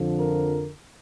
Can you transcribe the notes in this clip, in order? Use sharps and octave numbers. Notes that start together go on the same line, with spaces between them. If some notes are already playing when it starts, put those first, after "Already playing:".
Already playing: F2 D3 F3
A#4